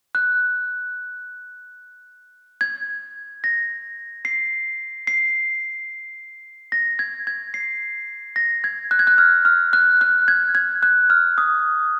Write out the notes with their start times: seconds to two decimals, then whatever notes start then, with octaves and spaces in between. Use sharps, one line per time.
0.15 F#6
2.61 G#6
3.44 A#6
4.25 C7
5.07 C7
6.72 A#6
6.99 G#6
7.27 G#6
7.54 C7
8.36 A#6
8.64 G#6
8.91 F#6
8.99 G#6
9.07 F#6
9.18 F6
9.45 F6
9.73 F#6
10.01 F#6
10.28 G#6
10.55 G#6
10.83 F#6
11.10 F6
11.38 D#6